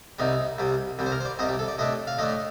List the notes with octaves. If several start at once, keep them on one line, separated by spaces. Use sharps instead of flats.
C2 C3 G3 D#4
C2 C3 G3
C2 C3 G3
C5
A#4
C5
D5
C2 C3 G3 D#5
G4
A4
D5
A2 A3 D4 D#5
F5
A2 A3 D4 D#5